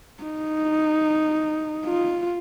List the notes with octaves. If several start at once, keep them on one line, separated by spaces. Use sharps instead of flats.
D#4
F4